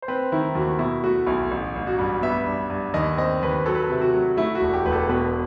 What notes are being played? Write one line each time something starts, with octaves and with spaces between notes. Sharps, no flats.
C5
C4 B4
D#3 E4
D#2 F#4
B2 E4
A3 F#4
B1 E4
A1
A1
F#4
G2
B3 E5
G2
G2
D#2 D#5
C4 D#5
D#2 B4
F#3 A4
B4
A4
C3
F#4
F#3
A3 E4
F#4
E1
G4
E1 B4
A4
B2 B4